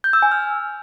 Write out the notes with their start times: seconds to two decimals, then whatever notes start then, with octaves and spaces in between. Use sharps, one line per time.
0.04 G6
0.13 E6
0.22 G#5
0.32 F6